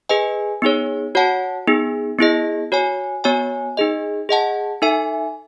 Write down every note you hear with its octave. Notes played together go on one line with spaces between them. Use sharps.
G#4 B4 D#5 G#5
B3 D#4 G#4 C#5
F#4 C#5 F#5 A5
B3 D#4 G#4
B3 E4 G#4 D#5
F#4 C#5 G#5
B3 F#4 C#5 G#5
D#4 G#4 D#5
G#4 D#5 F#5 A5
D#4 A4 E5 G#5